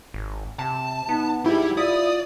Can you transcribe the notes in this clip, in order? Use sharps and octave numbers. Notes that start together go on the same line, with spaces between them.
G#1
C3 A5
B3 D#4
G#2 G3 E4 G4
E4 F4 D5 D#6